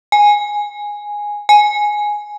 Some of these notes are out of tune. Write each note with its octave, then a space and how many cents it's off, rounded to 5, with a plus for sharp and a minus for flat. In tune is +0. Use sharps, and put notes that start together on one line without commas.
G#5 -5
G#5 +5